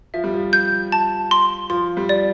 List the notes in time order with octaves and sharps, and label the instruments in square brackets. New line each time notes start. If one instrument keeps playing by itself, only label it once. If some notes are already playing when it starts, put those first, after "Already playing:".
[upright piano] F3 [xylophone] E5
[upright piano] G3
F3
[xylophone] G6
A5
C6
[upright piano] F3 [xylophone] C6
[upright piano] G3
[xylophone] D5